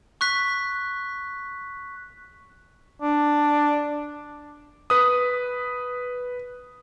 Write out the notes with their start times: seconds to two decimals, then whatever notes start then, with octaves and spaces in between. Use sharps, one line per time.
0.21 C#6 F#6 B6
3.02 D4
4.90 B4 D#6